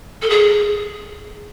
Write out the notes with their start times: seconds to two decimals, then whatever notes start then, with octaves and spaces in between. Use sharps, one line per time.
0.22 A4
0.30 G#4